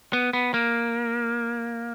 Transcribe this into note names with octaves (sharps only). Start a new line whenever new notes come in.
B3
B3
A#3